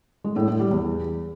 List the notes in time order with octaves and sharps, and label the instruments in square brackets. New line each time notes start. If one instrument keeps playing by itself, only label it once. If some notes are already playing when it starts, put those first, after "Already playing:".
[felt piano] G#3
A2
A2
G3
E2